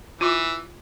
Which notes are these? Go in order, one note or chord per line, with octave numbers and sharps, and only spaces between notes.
E3 F4 C#6